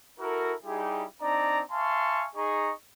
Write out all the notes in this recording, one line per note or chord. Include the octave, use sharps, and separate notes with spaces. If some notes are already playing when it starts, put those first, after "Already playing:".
E4 F#4 A4 A#4
G3 D#4 E4 G4 G#4
C4 D4 D#4 D5 A#5
E5 F5 G#5 A5 C6 C#6
D#4 G#4 D#5 A#5 C#6